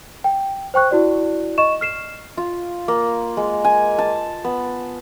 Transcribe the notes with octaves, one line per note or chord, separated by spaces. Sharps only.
G5
C5 G5 C#6 F#6
E4 F#4 D5
D#5 C#6 E7
F6 C7 E7
F4
A#3
G#3
G#5
A5
B3